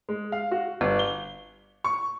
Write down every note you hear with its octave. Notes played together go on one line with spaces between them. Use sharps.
G#3
F5
F#4
G1
G7
C#6